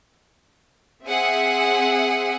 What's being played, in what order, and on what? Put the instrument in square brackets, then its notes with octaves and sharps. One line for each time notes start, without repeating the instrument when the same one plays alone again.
[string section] C4 G#4 E5 F#5